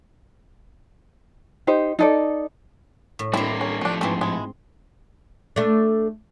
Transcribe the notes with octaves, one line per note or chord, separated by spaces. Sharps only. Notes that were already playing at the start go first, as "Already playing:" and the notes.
D#4 G4 C5
D#4 A4 D5
A2
G3 A#3 C4 D4 E4
C#4
A2 F3 A3 D4
G#2 E3 A3 C4
G#3 E4
A3 D4